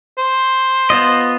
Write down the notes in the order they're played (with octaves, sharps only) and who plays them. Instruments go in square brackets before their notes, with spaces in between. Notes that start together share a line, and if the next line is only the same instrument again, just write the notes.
[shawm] C5
[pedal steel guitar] B3 F4 D#5